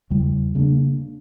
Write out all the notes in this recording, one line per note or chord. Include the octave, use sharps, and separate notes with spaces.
E2 C#3 G3
C#3 G3 A#3 D4